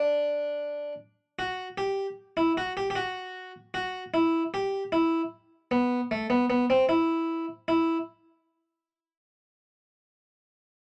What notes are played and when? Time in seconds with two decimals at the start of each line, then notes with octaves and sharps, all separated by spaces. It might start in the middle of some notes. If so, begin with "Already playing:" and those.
Already playing: D4
1.39 F#4
1.78 G4
2.37 E4
2.57 F#4
2.77 G4
2.90 G4
2.96 F#4
3.74 F#4
4.14 E4
4.54 G4
4.92 E4
5.71 B3
6.11 A3
6.30 B3
6.50 B3
6.70 C4
6.89 E4
7.68 E4